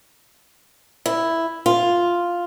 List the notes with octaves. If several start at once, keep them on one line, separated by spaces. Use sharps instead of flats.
E4
F4